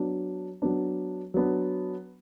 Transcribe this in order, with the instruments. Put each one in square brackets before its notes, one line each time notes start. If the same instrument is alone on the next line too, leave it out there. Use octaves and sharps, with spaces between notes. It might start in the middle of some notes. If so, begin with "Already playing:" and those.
Already playing: [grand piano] F#3 B3 D4
F#3 B3 D4
F#3 B3 D4